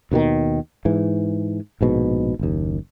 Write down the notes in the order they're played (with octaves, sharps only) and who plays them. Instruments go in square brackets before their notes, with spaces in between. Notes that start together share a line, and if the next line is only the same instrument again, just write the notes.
[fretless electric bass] D#2 B2 D3 D#3
G#2 E3
A#1 G#2 B2
F#1 D#2